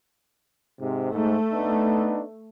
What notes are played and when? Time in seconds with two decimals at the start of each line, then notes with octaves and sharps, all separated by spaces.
0.80 G#2 C3
1.13 G#2 A3
1.52 B3 D4 D#4